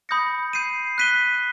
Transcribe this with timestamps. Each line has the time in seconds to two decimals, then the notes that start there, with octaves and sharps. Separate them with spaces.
0.09 B5 D#6 G6 A#6 C#7
0.53 G6 C7 D#7
0.98 F#6 B6 D#7 G7